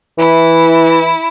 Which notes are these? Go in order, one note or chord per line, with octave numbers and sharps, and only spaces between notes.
E3 E4